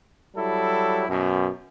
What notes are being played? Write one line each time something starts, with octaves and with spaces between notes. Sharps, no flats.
F#3 G3 E4 A4
F#2 B2